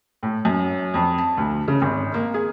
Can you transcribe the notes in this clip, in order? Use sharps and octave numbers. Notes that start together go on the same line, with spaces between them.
A2
F#2
F2
A5
D2
C#3
G#1
A#3
G#4